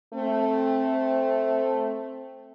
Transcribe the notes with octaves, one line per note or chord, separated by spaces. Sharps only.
A3 C4